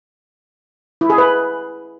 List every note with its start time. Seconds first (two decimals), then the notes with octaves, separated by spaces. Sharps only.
1.01 E4
1.10 G#4
1.18 B4